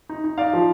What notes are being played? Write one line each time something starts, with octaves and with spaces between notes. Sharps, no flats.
D#4
D#4
D#4 D5 F5
F3